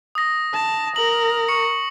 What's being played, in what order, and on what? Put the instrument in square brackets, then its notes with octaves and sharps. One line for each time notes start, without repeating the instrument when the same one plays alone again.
[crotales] D#6 A#6
[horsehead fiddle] A5
[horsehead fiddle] A#4 [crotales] F#7
[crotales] C#6 C#7